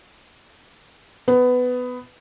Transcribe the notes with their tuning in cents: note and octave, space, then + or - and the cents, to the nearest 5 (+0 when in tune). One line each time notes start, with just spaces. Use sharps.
B3 +15